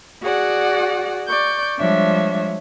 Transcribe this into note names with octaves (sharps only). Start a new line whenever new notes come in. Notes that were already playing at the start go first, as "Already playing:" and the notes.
F#4 G#4 D5 F#5
D5 C#6 G6
F3 G3 G#3 D4 C#5 E5